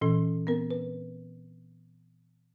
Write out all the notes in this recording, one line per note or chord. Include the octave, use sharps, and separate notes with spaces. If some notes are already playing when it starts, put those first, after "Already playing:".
A#2 E3 C#4 A4
B3 C4 A#4
B4